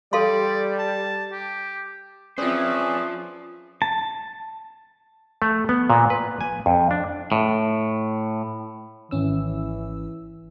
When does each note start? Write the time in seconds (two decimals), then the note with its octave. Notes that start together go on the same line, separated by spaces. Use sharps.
0.13 G3 A4 D5 F5 C6
0.79 A5
1.33 G4
2.38 C4 C#4 F4 G#4 B4 C5 D5 E5
3.82 A5
5.42 A3
5.69 B3
5.90 A#2
6.10 B4
6.41 G#5
6.66 F2
6.91 D4
7.32 A2
9.11 G#1 E3 C#4 E6